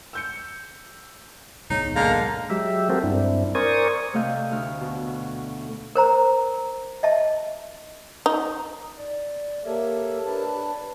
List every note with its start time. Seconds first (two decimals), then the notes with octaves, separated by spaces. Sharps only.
0.13 E6 G6 C#7
1.70 D1 B1 G#2 D#4 C#5
1.96 D3 G#3 A#3 F5 A#5
2.50 F#3 G#3 G4 E5
2.89 C4 F#4 G4 A4 A#4 C5
3.03 G2 C4 D4 E4
3.55 A#4 C5 D5 G#5 C#6 D#6
4.13 C3 A3 A4 D#5 F5 G6
4.51 D2 F6
4.81 B2
5.95 A#4 C5 A#5
7.03 D#5 E5 A5
8.26 D#4
8.98 D5
9.65 A#3 G4 A4 A#4 C#5 E5
10.25 D4 B4 A5